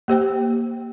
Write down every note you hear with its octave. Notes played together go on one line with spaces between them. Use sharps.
A#3 G4 C5 G5